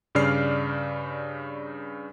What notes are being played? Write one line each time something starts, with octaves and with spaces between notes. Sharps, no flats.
G2 C#3 D5 F6 C7